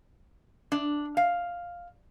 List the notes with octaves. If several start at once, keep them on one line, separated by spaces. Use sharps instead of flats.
D4
F5